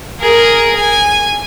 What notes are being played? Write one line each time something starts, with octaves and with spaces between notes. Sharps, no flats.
G#4 A#4
G#5